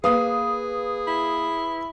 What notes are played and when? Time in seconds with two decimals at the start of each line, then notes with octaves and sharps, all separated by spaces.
0.04 A#3 G#4 B4 F5 D#6
1.07 E4